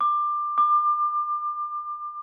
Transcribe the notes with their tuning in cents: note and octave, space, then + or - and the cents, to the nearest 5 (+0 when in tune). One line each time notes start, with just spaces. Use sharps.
D6 +20
D6 +30